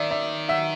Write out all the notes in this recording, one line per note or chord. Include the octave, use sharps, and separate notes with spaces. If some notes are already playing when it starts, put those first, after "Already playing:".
Already playing: D#3 D5 E5
D5 E5
E5 F#5